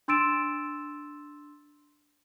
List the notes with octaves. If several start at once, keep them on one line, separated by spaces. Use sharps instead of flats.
D4 C6 E6 A6 D7 E7